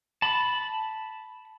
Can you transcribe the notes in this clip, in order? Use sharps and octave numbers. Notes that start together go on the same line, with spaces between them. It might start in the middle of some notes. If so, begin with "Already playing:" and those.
A5 B5